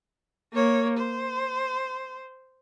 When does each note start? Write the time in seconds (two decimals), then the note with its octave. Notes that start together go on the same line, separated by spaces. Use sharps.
0.53 A#3 C#5
0.98 C5